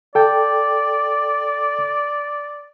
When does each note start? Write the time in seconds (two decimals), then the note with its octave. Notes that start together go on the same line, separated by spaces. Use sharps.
0.15 A4 D5 G5